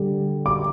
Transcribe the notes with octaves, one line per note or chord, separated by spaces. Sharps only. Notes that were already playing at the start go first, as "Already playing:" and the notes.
Already playing: D3 G3
D6